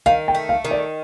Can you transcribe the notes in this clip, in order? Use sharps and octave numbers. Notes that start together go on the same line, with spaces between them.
D#3 F5
G5
A3
F5
D#3
D5